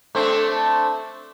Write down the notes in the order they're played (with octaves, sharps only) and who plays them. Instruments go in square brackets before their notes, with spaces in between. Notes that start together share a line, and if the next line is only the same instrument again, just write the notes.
[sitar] A3 C4 D4